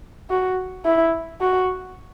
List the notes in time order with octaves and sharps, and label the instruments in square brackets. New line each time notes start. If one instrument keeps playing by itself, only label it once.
[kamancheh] F#4
E4
F#4